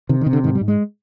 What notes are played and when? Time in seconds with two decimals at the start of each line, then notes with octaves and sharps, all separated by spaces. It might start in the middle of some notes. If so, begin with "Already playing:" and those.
0.09 C3 D#3
0.21 D#3
0.26 C3
0.33 D3
0.43 G#2 D#3
0.55 G3
0.61 G#2
0.68 G#3